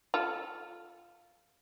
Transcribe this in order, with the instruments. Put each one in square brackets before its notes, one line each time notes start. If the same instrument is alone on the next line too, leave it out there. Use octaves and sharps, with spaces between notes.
[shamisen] F4 A4